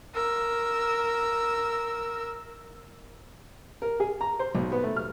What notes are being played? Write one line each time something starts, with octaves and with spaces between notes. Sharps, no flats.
A#4 E6
A#4
G#4
A#5
C5
B1
B3
A3
F6